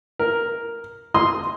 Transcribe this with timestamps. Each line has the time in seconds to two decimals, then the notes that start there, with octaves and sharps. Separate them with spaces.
0.19 A#4
1.14 C6 D#6